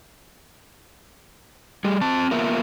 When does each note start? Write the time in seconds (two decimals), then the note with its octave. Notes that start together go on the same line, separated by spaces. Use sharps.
1.84 G3 G#4
2.01 C4 A5
2.31 A#3 B3 F4 A#4 E5